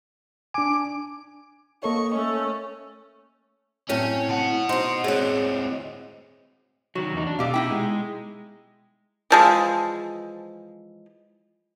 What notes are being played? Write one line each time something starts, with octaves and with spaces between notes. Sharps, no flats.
D4 G#5 D6
A#3 A4 C#5 D#5 C#6
A3 C#4
F#2 A2 C4 C#4 C#5
B2 F#5 A5
D#4 F#4 C5 C6
A2 G#3 C4 G#4 C#5 F#5
D#3 F#3 F#4
E2 D#4
D4
B2 A3 G4 F5
D#4 E4 G5
G#3
E3 F3 G#3